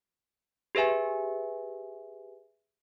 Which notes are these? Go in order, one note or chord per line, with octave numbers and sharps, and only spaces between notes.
G4 G#4 B4 E5 G#5